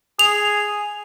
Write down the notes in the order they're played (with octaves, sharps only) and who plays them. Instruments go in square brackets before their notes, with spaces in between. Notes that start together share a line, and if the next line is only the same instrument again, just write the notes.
[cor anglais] G#4 [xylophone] F7